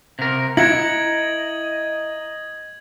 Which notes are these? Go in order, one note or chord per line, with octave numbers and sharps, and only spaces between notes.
C3 A#4 C5 F5 F#5
E4 A#4 D#5 F#5 G#6 F#7